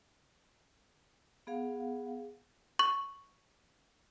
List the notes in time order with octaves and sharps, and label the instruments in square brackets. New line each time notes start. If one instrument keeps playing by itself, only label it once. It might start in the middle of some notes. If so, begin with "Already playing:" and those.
[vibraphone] B3 G#4 F5 F#5
[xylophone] C#6